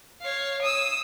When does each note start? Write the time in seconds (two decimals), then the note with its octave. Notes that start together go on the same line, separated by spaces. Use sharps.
0.21 C#5 F5
0.62 D#6 E6